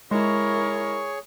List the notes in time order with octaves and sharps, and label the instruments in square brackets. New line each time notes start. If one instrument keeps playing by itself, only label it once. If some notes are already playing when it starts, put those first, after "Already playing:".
[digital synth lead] G#3 [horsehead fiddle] E4 A#4 [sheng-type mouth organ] G#4 C#5 C#6